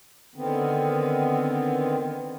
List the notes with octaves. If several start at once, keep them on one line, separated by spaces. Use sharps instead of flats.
D3 D#3 B3 C4